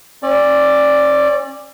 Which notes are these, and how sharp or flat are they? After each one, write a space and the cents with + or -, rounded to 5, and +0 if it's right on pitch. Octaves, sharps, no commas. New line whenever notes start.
C#4 -40 D5 +0